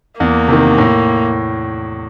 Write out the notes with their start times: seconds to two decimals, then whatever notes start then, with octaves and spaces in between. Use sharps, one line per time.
0.19 E2 A#3
0.48 C3 D#3
0.78 A2